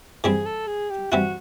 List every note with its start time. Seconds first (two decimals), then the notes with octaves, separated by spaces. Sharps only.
0.24 E3 G3 C4 E4 G#4
0.45 A4
0.67 G#4
0.90 G4
1.11 E3 G3 C4 E4 F#4